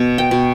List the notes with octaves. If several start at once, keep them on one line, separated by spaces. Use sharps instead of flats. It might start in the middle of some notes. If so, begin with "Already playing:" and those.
Already playing: B2
G5
B2